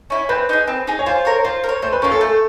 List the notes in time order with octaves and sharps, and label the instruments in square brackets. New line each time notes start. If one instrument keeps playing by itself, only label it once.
[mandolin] C#4 E4
[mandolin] C4 [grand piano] B4
[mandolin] D#4 G#4
C4
D#4 G#4
[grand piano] C#5
[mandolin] F4 [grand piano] C5
[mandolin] A#4 C#5
[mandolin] F4 [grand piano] C5
[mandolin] A#4
C#5
[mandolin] A3 [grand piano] C5
[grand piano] B4
[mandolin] C#4 F4 [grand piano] A#4
[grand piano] A4
[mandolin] A3